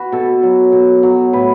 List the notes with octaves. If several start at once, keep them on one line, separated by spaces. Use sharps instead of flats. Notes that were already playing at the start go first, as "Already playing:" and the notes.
Already playing: F#4 B4
B2 A4
F#3
B2
F#3
A2 B4